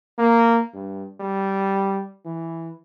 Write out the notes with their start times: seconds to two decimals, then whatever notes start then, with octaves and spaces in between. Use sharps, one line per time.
0.18 A#3
0.74 G2
1.20 G3
2.25 E3